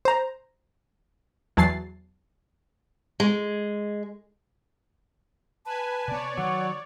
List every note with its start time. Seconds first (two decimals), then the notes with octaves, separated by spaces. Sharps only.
0.05 C5 A#5
1.57 E2 F#3 A5 A6 C7
3.20 G#3
5.66 B4 G#5 A5
6.08 C3 B3 C#5 D5
6.38 D#3 F#3 F#5